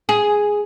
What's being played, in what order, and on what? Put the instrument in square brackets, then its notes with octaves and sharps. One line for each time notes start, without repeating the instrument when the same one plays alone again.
[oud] G#4